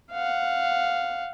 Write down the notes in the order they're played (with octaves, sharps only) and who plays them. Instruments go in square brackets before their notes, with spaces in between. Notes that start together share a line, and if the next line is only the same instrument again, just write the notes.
[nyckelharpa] F5 F#5